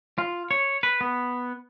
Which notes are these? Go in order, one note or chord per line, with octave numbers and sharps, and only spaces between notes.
F4
C#5
B4
B3